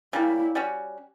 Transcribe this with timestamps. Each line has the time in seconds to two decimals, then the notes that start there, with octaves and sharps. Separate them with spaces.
0.13 C#3 G3 A#3 E4
0.55 G3 C#4 F#4